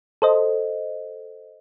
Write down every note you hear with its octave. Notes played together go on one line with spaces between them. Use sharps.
A4 C5 D#5